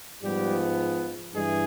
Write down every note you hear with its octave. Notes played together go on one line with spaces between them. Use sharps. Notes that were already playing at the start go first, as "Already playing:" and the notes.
G#2 F3 G3 G#3 B3 G4
G2 E3 G#3 G#4